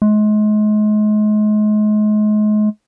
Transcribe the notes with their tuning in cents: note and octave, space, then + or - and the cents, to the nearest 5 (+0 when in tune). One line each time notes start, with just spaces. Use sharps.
G#3 +35